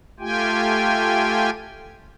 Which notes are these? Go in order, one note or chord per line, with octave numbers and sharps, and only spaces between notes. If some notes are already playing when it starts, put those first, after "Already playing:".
A3 F4 G4 G5 G#5